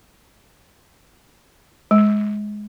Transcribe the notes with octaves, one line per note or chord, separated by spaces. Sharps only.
G#3